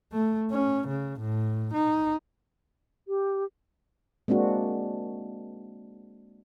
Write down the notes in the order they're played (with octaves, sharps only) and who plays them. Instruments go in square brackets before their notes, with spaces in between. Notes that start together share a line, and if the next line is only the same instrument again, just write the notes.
[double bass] A3
C#4
C#3
A2
D#4
[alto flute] G4
[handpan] G#3 A#3 C4 D4 F#4